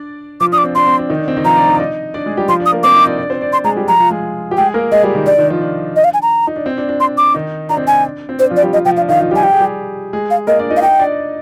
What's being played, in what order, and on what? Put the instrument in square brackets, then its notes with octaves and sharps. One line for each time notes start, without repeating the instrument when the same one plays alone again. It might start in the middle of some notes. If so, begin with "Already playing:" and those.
Already playing: [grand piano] D4 D5
[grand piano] F3 F4 [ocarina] D6
[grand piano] D4 [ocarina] D#6
[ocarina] D6
[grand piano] C4
[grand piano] D4 [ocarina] C6
[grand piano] C4
D4
D#3 D#4
D4
C4
D#3 D#4
[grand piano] F3 F4 [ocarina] A#5
[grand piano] D4 D5
D#4 D#5
D5
D#4 D#5
D4 D5
G#3 G#4
G3 G4
[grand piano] F3 F4 [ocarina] C6
[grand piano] D4
[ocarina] D#6
[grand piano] A#3 A#4
[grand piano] C4 C5 [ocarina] D6
[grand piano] D#4 D#5
D4 D5
D4 D5
C4 C5
D4 D5
[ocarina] C6
[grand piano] G#3 G#4 [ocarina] A#5
[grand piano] G3 G4
[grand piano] F3 F4 [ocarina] A#5
[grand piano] F3 F4
G#3 G#4
G4
[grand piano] G#3 G#4 [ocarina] G5
[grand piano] A#3 A#4
[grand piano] G#3 G#4 [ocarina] D#5
[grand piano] G3 G4
D#3 D#4
[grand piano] D4 [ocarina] D5
[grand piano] D#3 D#4
F3 F4
D4
[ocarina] D#5
F5
G#5
A#5
[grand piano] D#4
D4
C4
D4
D4
[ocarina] C6
D6
[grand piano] D#3 D#4
[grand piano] D4 [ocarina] A#5
[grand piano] C4
[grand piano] D4 [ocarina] G#5
[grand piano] C4
[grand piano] D4 [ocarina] C5
[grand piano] F3 F4
[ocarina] D5
[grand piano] G3 G4
[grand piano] F3 F4 [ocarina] D#5
[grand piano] F3 F4 [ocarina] G5
[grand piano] D4 [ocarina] F5
[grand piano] D#3 D#4 [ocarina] F5
[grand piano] F3 F4
[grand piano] G3 G4 [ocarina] G#5
[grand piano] G4 [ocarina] G5
[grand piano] G#4
G3 G4
G#3 G#4
[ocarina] F5
[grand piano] A#3 A#4 [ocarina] D#5
[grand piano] D4 D5
D#4 D#5
[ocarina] F5
[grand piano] D#4 D#5 [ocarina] G5
[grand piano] D4 D5